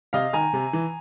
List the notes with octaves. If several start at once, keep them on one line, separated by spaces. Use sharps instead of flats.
C3 D#5 F5
D#3 G#5 A#5
C3
E3